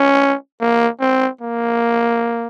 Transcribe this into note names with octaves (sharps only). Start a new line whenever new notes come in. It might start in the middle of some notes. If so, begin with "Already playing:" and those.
Already playing: C#4
A#3
C4
A#3